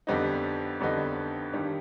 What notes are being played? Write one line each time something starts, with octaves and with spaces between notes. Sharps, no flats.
F2 D3 G3 B3 D#4
F2 D3 G3 B3 D#4
G2 D#3 G3